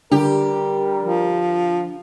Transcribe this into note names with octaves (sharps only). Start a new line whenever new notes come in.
D3 G3 G4 A#4
F3